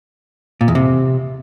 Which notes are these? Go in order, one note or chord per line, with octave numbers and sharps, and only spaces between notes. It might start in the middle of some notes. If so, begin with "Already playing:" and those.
A#2
E2
C3